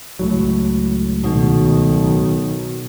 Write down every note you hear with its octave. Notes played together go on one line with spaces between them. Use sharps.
C#2 A2 F#3
B1 B2 D#3